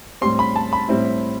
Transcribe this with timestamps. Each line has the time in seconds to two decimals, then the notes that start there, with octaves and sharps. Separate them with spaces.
0.21 A2 G3 C4 C6
0.39 B5
0.56 A5
0.73 B5
0.88 A2 G3 C4 E4